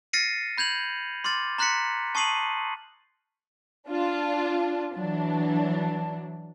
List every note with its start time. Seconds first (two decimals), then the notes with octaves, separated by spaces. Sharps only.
0.13 F6 A6 A#6 C7 C#7 D#7
0.58 B5 G6 G#6 F7 F#7
1.24 C6 D6 F6 A6
1.59 A#5 C6 F#6 A#6 B6 C#7
2.15 A5 C#6 D#6 C7 D#7 F#7
3.88 D4 F4
4.94 E3 F#3 D4